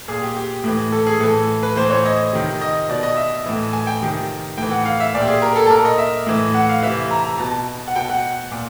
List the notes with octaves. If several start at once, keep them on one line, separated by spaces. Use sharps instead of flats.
A#2 G#4
G4
G4
A2 E3
A4
G#4
A2 E3 A4
B4
A2 E3 C5
C#5
D#5
C3 D#3
D#5
B2 D5
D#5
E5
A2 E3
G#5
G5
C3 D#3
A2 E3 G5
F#5
F5
E5
A#2 D5
G4
G#4
A#4
A4
A4
A#2 A#4
D#5
E5
A2 E3
F#5
F5
C3 E3 E5
A#5
A#5
B2 A5
F#5
B2 G5
F#5
A#2